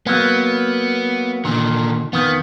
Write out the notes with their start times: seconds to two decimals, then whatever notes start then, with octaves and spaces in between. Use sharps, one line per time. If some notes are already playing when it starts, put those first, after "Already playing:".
0.06 F#3 A#3 B3
1.45 A#2 D3 D#3
2.13 F2 D#3 B3